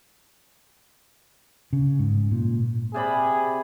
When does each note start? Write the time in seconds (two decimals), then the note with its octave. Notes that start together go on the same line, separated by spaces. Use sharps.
1.73 C#3
1.99 G#2
2.31 A#2
2.94 C3 G#4 D5 B5